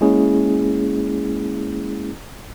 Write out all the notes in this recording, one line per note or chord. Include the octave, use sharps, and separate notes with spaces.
G#3 A#3 C#4 E4 G#4